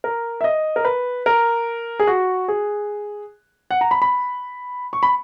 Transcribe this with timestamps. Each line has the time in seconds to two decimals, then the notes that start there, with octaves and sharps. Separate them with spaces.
0.04 A#4
0.41 E5
0.44 D#5
0.76 A#4
0.85 B4
1.26 A#4
1.99 G#4
2.07 F#4
2.48 G#4
3.71 F#5
3.81 A#5
3.91 B5
4.02 B5
4.93 C#6
5.03 B5